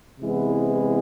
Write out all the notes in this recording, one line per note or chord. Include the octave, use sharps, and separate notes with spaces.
C3 E3 G#3 B3 E4